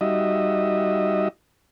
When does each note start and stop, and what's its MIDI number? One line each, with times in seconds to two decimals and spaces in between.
0.01 1.28 55
0.01 1.28 63
0.01 1.28 66
0.01 1.28 75
0.01 1.28 76